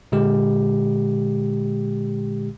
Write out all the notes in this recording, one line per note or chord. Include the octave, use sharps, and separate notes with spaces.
A#2 D3 G#3 G4